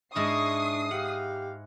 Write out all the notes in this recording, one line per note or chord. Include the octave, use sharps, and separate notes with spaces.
G#2 G#3 D4 E4 C#6 D#6 C7
G4 F5 F#5